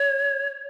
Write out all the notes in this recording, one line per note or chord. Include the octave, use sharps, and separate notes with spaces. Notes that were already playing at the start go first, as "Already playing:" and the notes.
Already playing: C#5